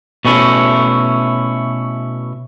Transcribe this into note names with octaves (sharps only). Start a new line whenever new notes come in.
B2 A3 C#4 E4